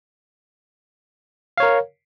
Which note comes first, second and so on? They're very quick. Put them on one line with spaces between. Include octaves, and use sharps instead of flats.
F5 C#5 A#4